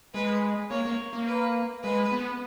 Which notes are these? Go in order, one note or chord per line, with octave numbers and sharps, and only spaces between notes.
G#3 B4
A#3 C#5
A#3
A#3
B4
G#3 B4
B3